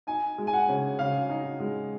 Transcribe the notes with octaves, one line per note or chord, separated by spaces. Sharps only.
D#4 G#5
G#3
G#5
F#5
C#3
C#3 F5
D#4
G#3